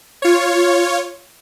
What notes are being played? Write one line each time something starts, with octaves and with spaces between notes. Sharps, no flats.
F4 C#5